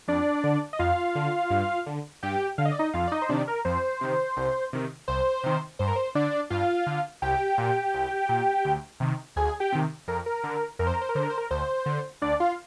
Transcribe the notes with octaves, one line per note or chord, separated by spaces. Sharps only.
F2 D4 D5
D3
D#5
F2 F4 F5
D3
G2
D3
G2 G4 G5
D3 F5
D#5
D5
D#4 D#5
F2 F4 F5
D5
D#4 D#5
C5
C3 D#3 D4 D5
A#4
F2 C5
C3 D#3
C2
C3 D#3
C2 C5
C3 D#3
G2 C5
A#4
C5
D3 D4 D5
G2 F4 F5
D3
C2 G4 G5
A#2
C2
A#2
D2
C3 D#3
D2 G#4 G#5
G4 G5
C3 D#3
F2 A#4
A#4
D3
F2 A#4
C5
A#4
C5
A#4
D3 C5
A#4
C5
A#4
D2 C5
D3
D2 D4 D5
F4 F5